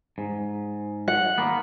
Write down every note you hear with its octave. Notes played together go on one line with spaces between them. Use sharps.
G#2
F#5
D#3 A#3 B3